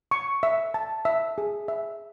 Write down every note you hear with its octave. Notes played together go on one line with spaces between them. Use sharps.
C#6
E5
A5
E5
G#4
E5